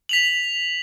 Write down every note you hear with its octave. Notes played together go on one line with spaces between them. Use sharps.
B6 F7 F#7